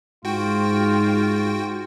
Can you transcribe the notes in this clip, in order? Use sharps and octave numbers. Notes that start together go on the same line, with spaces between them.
G#2 F4 F#4 G5